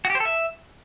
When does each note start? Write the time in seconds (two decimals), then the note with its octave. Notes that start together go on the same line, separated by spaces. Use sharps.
0.05 F#4
0.10 G4
0.15 C5
0.20 A4
0.25 E5